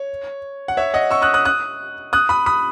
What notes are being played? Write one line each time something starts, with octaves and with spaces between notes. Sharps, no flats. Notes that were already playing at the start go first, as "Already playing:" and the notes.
Already playing: C#5
F#5
C#5 E5
D#5 F#5
C#6 E6
D#6 F#6
D#6 F#6
D#6 F#6
D#6 F#6
B5 D#6
B5 D#6